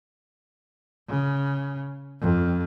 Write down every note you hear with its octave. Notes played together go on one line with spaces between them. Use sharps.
C#3
F2